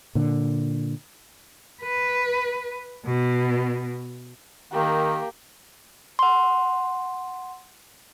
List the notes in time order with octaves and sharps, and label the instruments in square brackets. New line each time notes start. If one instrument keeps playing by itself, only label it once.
[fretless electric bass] A#2 D3
[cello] B4
B2
[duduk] D#3 [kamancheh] A#3 G4
[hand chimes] F#5 C6